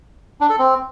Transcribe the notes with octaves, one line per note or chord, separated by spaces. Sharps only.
D4
A4
C4